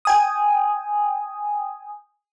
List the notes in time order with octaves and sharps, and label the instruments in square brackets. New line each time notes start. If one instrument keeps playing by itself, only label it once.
[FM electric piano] G5 G#5 D#6